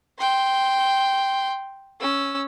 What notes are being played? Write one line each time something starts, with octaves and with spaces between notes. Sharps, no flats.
G5 C6
C#4 E6